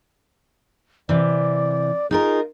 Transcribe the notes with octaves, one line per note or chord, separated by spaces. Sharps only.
C3 E3 D5
D#4 F4 G#4 A#4